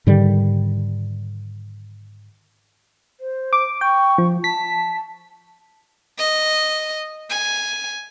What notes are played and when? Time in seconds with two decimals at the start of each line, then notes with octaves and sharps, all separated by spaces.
0.07 G#2 D3 D#3 G3
3.20 C5
3.53 D6
3.81 G5 C#6
4.18 F3
4.44 A5 B6
6.19 D#5
7.30 G#5